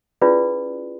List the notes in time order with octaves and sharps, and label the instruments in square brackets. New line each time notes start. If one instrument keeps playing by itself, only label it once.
[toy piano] C#4 E4 F4 G#4 B4 D5